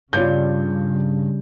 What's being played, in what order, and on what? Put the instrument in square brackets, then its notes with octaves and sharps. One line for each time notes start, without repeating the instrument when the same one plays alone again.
[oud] G2 [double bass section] C#3 [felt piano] F4 C#5 G6